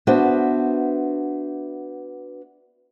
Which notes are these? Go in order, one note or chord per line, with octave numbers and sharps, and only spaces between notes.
B3 D4 F#4 B4 C5 E5